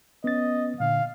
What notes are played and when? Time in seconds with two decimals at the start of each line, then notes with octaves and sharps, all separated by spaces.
0.24 B3 C#4 D#5 A6
0.80 A#2 D3 F5